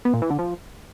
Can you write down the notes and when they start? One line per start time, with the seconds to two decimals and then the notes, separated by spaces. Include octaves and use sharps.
0.05 B3
0.13 A#2
0.22 E3
0.30 D3
0.39 F3